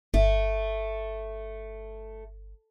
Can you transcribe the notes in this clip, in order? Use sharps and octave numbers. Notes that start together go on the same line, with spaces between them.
G1 A3